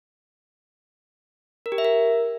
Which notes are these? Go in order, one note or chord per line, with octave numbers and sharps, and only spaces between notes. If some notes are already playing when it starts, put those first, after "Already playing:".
A#4
G4
E5
A#4